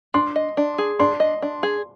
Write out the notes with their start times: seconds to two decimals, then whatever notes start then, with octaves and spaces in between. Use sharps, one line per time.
0.14 D4 C6
0.36 D#5
0.57 D4
0.78 G#4
0.99 D4 C6
1.20 D#5
1.42 D4
1.63 G#4